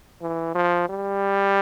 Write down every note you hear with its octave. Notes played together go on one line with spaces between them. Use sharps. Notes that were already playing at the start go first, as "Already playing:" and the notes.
E3
F3
G3